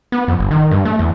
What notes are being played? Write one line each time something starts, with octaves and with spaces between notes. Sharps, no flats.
B3
F2
G1
D#3
G2
A3
E2